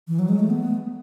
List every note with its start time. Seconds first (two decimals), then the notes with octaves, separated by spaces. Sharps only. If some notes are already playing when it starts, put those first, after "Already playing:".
0.08 E3
0.19 F#3
0.28 G#3
0.39 A3
0.50 B3